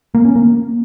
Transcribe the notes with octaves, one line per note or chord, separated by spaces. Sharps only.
A#3
C#4
A#3